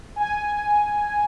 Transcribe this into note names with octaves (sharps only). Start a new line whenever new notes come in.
G#5